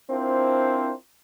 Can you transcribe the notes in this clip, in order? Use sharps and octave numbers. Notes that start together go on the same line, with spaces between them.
C4 D4 E4 F4 A#4 C5